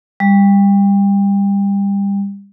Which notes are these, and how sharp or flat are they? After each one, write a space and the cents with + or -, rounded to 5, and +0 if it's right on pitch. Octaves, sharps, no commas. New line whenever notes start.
G3 +25